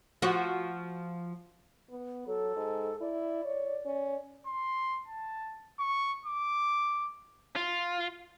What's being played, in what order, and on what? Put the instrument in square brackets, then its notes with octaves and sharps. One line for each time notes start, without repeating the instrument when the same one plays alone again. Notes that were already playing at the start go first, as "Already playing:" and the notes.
[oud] F3 F#4
[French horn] B3
[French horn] F#3 [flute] A4
[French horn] G#2
[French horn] E4 [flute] D5
[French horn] C#5
C#4
[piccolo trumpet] C6
A5
C#6
D6
[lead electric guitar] F4